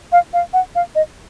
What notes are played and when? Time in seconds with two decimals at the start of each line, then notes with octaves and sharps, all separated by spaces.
0.12 F5
0.33 F5
0.53 F#5
0.75 F5
0.95 D#5